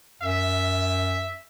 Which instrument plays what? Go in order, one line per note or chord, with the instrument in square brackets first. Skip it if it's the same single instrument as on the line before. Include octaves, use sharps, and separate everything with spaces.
[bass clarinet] F#2 [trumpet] E5